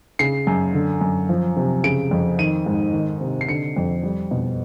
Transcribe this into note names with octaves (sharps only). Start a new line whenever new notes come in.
C#3 C7
F#2
D3
F#2
F3
C3
C#3 D7
F2
D#3 D#7
G#2
D#3
C3
C7
D3 C#7
F2
G3
B2